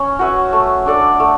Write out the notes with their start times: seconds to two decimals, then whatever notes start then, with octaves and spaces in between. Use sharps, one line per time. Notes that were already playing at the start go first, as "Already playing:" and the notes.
Already playing: C#4
0.19 F#4 B4 E5
0.53 A3
0.86 D4 A4 D5
1.20 A3